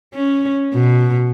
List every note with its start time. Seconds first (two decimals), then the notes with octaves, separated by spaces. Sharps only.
0.14 C#4
0.74 B2